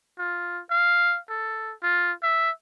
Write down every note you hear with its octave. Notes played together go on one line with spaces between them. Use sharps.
F4
F5
A4
F4
E5